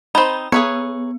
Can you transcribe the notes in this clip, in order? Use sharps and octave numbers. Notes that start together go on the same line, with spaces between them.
C4 D#4 B5
B3 G#4 B4 C#5